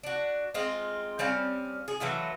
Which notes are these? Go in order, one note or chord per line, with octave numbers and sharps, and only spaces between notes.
D4 F#4
G#3 C4 D#4 F4
G3 C4 C#4 F5
G#4
E3 F#3 A3 F4